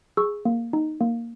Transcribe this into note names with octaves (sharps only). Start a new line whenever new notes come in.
G#4 C#6 E6
A#3
D#4
A#3